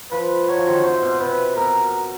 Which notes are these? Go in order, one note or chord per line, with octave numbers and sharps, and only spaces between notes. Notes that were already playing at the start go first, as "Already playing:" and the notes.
F3 B4
F#3 C#5
F3
D#3
D3
C3 C5
B2
C3 B4
B2 A#4